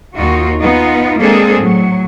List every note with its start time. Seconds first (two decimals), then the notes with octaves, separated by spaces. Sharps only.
0.15 D#2 D#4 F4 F#4
0.60 B3 D#4 F4
1.19 G#3 A#3 C4 D4 G#4 A4
1.58 A2 F#3